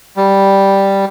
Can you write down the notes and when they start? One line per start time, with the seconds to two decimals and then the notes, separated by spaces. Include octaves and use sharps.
0.17 G3